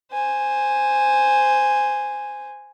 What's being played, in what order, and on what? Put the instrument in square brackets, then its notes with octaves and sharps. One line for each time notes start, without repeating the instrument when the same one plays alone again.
[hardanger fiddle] C5 G#5